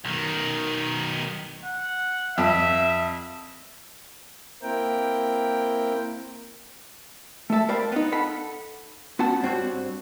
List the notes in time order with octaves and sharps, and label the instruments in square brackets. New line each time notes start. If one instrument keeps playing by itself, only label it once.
[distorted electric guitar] B1 D#3
[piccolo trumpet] F#5
[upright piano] F2 [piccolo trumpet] E5
[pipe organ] A#3 C4 E4 A#4 G5
[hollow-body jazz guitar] A3 A4 E5 A5
A#4 C5 D5 F5 G5 B5
B3 D#4
A4 F5 F#5 A5 B5
B3 C#4 F#4 F#5 A5
G2 C4 F#4 C#5